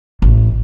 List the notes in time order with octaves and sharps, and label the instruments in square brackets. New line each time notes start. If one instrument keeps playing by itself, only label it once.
[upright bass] A1